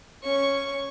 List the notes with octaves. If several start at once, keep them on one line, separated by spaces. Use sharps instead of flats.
C#4 C#6